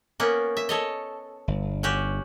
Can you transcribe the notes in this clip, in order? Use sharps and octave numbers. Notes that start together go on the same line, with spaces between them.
A#3 B3 C#4
E5
A4 C#5 D#5
G1
C#4 F#4 G4